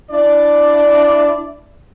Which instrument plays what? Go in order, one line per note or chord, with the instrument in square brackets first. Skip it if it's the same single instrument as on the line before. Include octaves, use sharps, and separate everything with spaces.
[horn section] D4 E4 D5